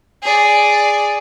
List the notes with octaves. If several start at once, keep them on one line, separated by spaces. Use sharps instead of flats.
G#4 D5